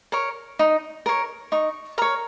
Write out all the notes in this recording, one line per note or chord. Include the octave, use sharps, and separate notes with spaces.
A#4 C#5
D#4
A#4 C#5
D#4 C#6
A#4 C#5 A#5